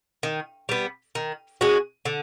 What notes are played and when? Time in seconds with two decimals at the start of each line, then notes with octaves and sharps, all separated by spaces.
0.23 D#3
0.69 G3 B3
1.15 D#3
1.61 G#3 C#4 F#4
2.05 D3